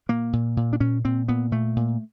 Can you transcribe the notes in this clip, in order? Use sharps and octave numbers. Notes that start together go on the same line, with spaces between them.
A#2 A#3
A#2
A#2
D4
A#2 C#4
A#2 C4
A#2 B3
A#2 A3
A#2